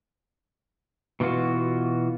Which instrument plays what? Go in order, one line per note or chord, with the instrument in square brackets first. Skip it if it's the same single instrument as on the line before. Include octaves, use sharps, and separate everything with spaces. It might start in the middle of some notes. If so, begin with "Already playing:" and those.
[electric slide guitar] B2 E3 G3 F4 F#4